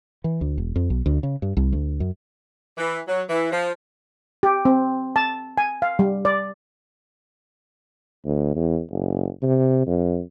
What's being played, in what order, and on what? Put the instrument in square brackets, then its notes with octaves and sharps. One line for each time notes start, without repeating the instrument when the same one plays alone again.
[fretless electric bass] E3
D2
E1
F2
B1
D2
C#3
G2
C2
D2
F#2
[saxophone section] E3
F#3
E3
F3
[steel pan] G4
C4
A5
G#5
F5
G3
D5
[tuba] D2
E2
F#1
C3
F2